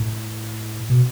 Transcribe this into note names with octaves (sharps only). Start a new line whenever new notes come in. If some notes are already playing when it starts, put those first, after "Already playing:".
Already playing: A2
B2